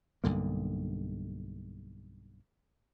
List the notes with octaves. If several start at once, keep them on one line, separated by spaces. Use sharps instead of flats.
B1 G2 D3 A#3